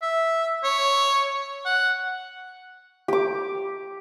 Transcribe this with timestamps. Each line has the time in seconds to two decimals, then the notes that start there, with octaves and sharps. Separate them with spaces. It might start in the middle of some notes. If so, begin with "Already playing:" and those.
0.02 E5
0.64 C#5
1.65 F#5
3.08 G4 D6